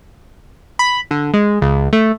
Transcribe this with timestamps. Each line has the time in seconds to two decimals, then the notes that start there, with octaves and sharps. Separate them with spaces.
0.79 B5
1.11 D3
1.34 G#3
1.62 C#2
1.93 A3